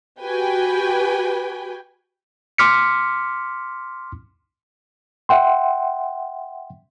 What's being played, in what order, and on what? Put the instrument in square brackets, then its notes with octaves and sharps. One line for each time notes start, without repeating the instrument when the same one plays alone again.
[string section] F#4 G4 B4 G5 G#5
[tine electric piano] C6 D6 F6 B6 C#7
[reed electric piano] E5 F#5 G5 C6